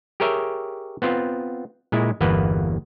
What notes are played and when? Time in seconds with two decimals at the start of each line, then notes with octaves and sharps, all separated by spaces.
0.20 G4 G#4 A#4 C#5 E5 G5
1.02 B3 C4 F4
1.92 A#2 G#3 E4
2.21 G1 E2 A#3 B3 B4